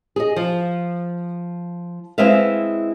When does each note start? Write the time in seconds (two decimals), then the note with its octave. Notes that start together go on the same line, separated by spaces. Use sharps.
0.16 G#4 D#5
0.36 F3
2.18 G#3 C4 E4 B4 E5 F5